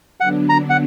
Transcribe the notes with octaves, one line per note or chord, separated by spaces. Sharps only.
D3 F#3 B3 D4 F#5
A#5
F#5